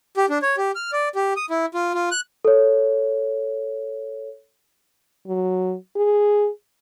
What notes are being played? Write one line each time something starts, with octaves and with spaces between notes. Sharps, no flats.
G4
D4
C#5
G4
F6
D5
G4
D#6
E4
F4
F4
F#6
A4 C#5
F#3
G#4